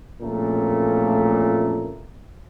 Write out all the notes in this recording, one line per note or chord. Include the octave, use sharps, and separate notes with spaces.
A1 F2 A#2 C#3 A3 A#4